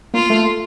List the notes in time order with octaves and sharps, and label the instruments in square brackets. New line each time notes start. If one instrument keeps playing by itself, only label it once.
[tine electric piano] A#3 [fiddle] F4
[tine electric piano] A3